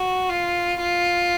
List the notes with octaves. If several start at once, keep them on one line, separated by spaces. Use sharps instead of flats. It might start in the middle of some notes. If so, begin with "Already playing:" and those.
Already playing: F#4
F4
F4